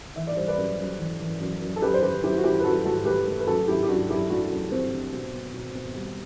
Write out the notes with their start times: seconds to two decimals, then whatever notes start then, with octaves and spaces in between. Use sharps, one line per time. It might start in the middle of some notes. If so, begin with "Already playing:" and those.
0.16 E3 E5
0.27 D5
0.37 G3 C5
0.48 B4 D5
0.57 F#2
0.78 F#2
0.99 E3
1.20 E3
1.40 F#2
1.61 F#2
1.76 A4
1.82 F#2 G4 B4
1.94 C5
2.02 F#2 G4 B4
2.23 F#2 E4 G4
2.37 F#4
2.44 F#2 E4 G4
2.59 B4
2.64 F#2 F#4 A4
2.85 A3 F#4 A4
3.05 A3 G4 B4
3.27 A3
3.40 B4
3.47 F#2 F#4 A4
3.68 F#2 E4 G4
3.83 G4
3.88 F#2 D4 F#4
4.09 F#2 E4 G4
4.22 E4
4.30 A3 D4 F#4
4.51 F#2
4.71 A3 C4
4.92 D3
5.12 B2
5.34 B3
5.54 B2
5.75 B3
5.95 G3